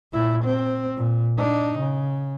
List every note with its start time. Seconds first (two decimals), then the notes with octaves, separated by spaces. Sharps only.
0.12 A#2 E4
0.44 C4
0.97 A#2
1.38 D4 D#4
1.79 C#3